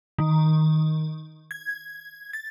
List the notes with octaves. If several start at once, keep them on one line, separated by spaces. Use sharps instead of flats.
D#3
G#6
A6